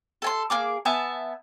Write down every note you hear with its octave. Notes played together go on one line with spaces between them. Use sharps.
A4 G#5 C6
A#3 G#4 D6
B3 E5 G#5 A5